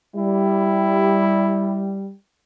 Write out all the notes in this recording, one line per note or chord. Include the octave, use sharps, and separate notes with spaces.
G3 E4